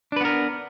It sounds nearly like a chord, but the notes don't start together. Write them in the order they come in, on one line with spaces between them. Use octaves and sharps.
D4 B4 B3 A#4